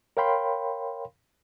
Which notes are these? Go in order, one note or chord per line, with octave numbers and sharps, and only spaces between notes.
A#4 C#5 F5 G5 B5 C6